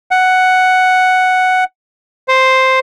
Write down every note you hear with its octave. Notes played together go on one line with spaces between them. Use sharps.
F#5
C5